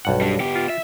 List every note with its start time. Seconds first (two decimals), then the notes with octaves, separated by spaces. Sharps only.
0.05 B1 G2 F#5
0.21 G3 D4
0.40 B3 G4
0.55 F4
0.69 E5